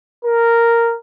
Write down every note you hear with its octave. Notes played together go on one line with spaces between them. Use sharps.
A#4